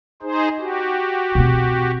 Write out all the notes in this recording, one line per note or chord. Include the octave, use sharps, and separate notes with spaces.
D#4 G#4 C5
F#4 G4
B2 C4